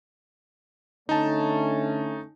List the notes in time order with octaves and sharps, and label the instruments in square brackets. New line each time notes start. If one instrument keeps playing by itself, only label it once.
[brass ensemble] D3 A3 C#4 [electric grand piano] D#4 A5